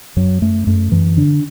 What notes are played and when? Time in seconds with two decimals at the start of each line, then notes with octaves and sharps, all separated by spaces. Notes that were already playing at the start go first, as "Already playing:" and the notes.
0.17 F#2 F#3
0.42 F#2 A3
0.67 F#2 A3
0.92 F#2 E3
1.17 D3 D4